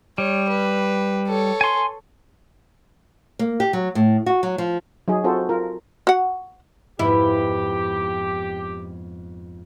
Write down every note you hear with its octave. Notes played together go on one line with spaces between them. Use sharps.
G3 C#5
B4
A4 C#5
G#5 C6
A#3
G4
F#3
A2
F#4
F#3
F3
F#3 D#4 G#4
C4 F4 F#4 A4 C5
F4 A#4
F#4 F#5
F2 G#2 B3 E4 G4